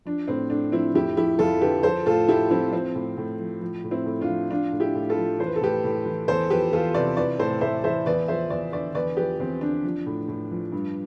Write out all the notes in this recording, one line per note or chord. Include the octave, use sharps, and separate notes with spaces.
F3 D4
A2 C4
A2 D4
F3 C4 E4
F2 E4 G4
F3 E4 G4
F2 F4 A4
D3 G4 B4
F3 A4 C5
A2 F4 A4
A2 E4 G4
F3 C4 E4
F3 C4
A2
A2
F3
F3
A2
C4 E4
A2
D4 F4
F3
F3 D4 F4
A2
E4 G4
A2
F4 A4
F3
E3 C5
B4
A4
A2 G4 B4
A2
E3
E2 A4 C5
F3 G4 B4
E2 F4 A4
C3 B4 D5
E3 B4 D5
A2 A4 C5
A2 C5 E5
E3 C5 E5
E2 B4 D5
F3 C5 E5
E2 B4 D5
D3 B4 D5
E2 B4 D5
F3 G4 B4
E2 C4
D3 D4
F3
A2
A2
F3
G2